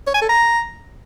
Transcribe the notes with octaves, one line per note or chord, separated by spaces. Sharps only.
C#5
G#5
A4
A#5